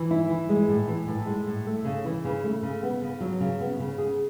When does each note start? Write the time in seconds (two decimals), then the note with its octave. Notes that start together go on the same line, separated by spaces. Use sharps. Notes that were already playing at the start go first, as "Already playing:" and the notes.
Already playing: E3
0.11 E4
0.30 E3
0.49 G#3
0.68 A2
0.88 E3
1.08 A2
1.26 G#3
1.47 A2
1.66 A3
1.85 C#3
2.05 E3
2.25 C#3
2.44 A3
2.63 C#3
2.83 B3
3.01 C#3
3.20 F#3
3.41 C#3
3.60 B3
3.79 C#3
3.98 G#4